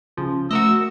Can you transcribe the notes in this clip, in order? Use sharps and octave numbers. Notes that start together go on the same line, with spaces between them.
C#3 F3
A3 F#4 A#4 D#5 E6